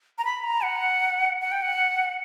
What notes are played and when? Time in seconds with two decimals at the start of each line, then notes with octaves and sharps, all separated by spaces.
0.18 A#5
0.25 B5
0.44 A#5
0.63 F#5
1.41 F#5
1.52 G5
1.62 F#5